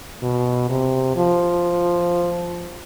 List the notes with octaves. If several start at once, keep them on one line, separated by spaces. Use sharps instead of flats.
B2
C3
F3